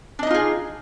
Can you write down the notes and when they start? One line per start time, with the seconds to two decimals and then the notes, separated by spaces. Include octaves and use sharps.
0.19 D4
0.23 D#5
0.27 D#4
0.31 F4
0.34 G#4